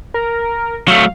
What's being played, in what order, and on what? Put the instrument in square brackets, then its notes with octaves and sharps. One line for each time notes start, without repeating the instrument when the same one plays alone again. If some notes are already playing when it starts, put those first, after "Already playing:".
[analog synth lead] A#4
[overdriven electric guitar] F#3 A3 [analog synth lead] F5